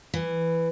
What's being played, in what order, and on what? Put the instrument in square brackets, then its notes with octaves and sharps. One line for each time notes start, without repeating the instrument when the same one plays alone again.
[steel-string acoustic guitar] E3